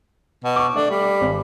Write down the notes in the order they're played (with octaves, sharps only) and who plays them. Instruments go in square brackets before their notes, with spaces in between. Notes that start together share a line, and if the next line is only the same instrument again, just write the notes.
[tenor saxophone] B2
[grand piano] C#6 D6
[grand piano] A3 [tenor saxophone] D4
[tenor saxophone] G3
[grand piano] G#1